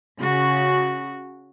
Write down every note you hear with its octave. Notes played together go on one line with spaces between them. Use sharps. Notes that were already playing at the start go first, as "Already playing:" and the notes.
C#3 F#4